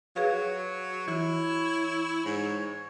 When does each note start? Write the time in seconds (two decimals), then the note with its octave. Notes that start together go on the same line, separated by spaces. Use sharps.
0.16 F#3 G#4 B4 C#5 F5
1.08 E3 E4 F#4
2.25 G#2 C#5